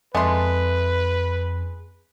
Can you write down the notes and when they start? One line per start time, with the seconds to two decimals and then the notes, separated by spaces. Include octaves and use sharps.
0.15 F2 G#3 A3 D4 B4 C6